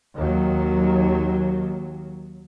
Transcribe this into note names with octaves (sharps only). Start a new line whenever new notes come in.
D#2 F#3